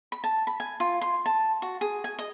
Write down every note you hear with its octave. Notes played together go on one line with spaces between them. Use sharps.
B5
A5
B5
G#5
F4
C6
A5
F#4
G#4
G#5
D#5